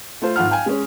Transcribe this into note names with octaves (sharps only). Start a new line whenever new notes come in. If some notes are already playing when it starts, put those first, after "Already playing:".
A3 F4 C5
G#1 F4 F#5 F6
F5 G5 G#5
G#3 C#4